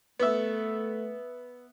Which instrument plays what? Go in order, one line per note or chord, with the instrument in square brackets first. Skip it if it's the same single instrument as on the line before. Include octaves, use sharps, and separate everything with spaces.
[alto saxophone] A3 [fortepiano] B3 E5